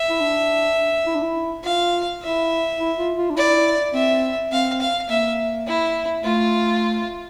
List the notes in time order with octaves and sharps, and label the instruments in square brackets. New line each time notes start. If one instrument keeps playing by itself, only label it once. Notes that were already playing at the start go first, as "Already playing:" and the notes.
Already playing: [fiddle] E5
[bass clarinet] E4
D4
E4
D4
E4
[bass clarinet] F4 [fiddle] F5
[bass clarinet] E4 [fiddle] E5
[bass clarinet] E4
F4
F4
D4
[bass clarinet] E4 [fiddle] D5
[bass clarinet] C4 [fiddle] E5
[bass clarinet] C4 [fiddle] F5
[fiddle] F5
[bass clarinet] A#3 [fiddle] E5
[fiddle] E4
[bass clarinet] A3 [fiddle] F4